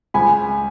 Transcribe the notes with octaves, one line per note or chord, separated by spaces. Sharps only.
C#2 G#5 B5